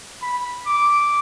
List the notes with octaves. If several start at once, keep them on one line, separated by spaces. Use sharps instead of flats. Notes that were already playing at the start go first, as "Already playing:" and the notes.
B5
D6